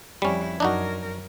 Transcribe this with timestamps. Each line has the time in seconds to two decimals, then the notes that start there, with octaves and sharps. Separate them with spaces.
0.22 F2 G3 C#4 E4
0.60 F#2 D4 D#4 F#4 A#4